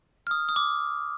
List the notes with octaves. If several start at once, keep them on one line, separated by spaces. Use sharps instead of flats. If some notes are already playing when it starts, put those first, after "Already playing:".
F6
D#6
D#6
D6